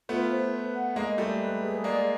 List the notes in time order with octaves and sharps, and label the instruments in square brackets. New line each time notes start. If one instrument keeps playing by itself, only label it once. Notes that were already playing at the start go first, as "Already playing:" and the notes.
[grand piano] A3 B3 [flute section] F4
[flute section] C5
B4
F#5
[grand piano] G#3 A#3 [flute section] D#5
[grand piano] G3 A3 [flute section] A4
[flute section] B4
G#4
[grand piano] G#3 A#3 [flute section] D5